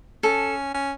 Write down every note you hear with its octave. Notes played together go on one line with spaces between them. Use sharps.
C#4 A4
C#4